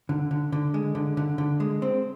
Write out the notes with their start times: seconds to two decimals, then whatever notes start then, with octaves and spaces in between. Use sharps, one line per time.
0.09 D3
0.31 D3
0.52 D3
0.74 G#3
0.95 D3
1.17 D3
1.38 D3
1.60 G#3
1.82 C4